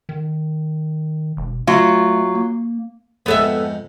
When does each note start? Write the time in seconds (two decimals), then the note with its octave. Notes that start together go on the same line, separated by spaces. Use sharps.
0.09 D#3
1.37 E1
1.67 F#3 A3 F4
2.35 A#3
3.26 F2 G#2 B3 A4 E5